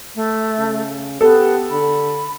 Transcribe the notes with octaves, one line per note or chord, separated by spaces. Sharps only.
A3
C#3
B3 G4 A4
D3 B5